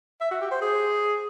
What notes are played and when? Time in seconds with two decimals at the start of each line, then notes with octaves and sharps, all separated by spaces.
0.21 E5
0.31 F#4
0.41 G4
0.51 C5
0.62 G#4